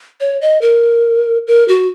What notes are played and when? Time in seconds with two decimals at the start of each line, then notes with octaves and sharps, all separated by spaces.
0.20 C#5
0.41 D#5
0.62 A#4
1.47 A#4
1.68 F#4